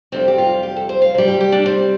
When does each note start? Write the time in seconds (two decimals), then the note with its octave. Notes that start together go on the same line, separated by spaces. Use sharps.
0.12 F2 C3 G3 C4
0.28 G4
0.38 F4
0.63 G4
0.76 A4
0.89 C5
1.02 F5
1.15 C3 G3
1.28 G4
1.40 G4
1.52 D4
1.66 C4